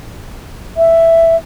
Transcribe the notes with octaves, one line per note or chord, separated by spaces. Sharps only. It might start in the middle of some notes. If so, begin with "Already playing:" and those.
E5